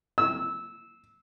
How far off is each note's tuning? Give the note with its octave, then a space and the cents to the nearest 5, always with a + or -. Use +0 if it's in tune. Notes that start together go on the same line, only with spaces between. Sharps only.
E6 -15